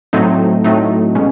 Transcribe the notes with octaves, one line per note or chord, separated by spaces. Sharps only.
A2 F#3 A3 C4 D#4
A2 F#3 A3 C4 D#4
B2 G#3 C#4